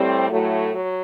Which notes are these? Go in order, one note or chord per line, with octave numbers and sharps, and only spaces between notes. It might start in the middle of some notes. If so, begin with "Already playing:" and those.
Already playing: A2 G3 C4
A2 F#3 A3
F#3